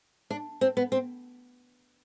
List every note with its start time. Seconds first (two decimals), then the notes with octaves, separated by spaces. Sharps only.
0.30 D4
0.61 C4
0.77 B3
0.92 C4